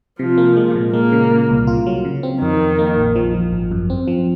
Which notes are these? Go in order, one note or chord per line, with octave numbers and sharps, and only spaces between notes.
C3 F3
A#3
G#3
A#2
G#3 A#3
C#3
A#2
C2
F4
F#3
C#3
C4
F2 D#3
F2
A#3
A#1
F3
F3
G#1
F#2
C4
F3